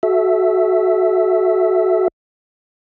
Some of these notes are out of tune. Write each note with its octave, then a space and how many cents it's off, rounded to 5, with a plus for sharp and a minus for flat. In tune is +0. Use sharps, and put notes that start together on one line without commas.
F#4 +0 A4 -40 E5 +0